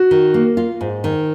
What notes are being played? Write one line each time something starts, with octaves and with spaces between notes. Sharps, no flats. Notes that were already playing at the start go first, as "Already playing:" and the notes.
Already playing: F#4
D#3
A#3
F4
G#2
D#3